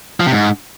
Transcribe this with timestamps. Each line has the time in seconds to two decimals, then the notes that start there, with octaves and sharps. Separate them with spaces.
0.20 F3
0.26 C3
0.33 G#2